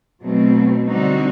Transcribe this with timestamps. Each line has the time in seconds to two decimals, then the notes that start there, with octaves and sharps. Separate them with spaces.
0.22 B2 F#3 A3 C4
0.87 D3 G3 C4 D#4 F#4